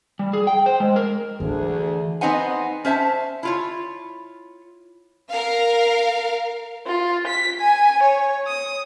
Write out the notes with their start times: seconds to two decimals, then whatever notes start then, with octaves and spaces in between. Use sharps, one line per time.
0.19 G3
0.33 G#4
0.47 G5
0.66 C5
0.80 G#3
0.96 A#4
1.40 D2 E3 D4 G#4
2.21 B3 C4 D#4 C5 F#5 G#5
2.85 C#4 C5 E5 A5
3.43 E4 F4 C#5
5.29 A#4 F5
6.87 F4
7.27 B6
7.60 G#5
8.03 C#5
8.47 D#6